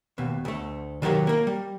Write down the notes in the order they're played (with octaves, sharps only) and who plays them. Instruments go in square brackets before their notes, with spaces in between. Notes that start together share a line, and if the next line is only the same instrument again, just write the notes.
[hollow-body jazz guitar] D#2 B2
D2 A3
D#3 F#3 G4 A#4 C#5
A#3 A#4
G3